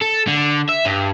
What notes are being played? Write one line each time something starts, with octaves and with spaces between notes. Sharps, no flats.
A4
D3
E5
G2